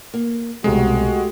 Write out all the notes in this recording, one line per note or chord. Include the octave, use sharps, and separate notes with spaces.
A#3
C2 B2 G#3 A3 C4 F#4 G4